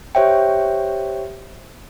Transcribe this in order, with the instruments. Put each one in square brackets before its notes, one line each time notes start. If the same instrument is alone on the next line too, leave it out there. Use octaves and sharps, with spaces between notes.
[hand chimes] G4 C5 C#5 E5 G5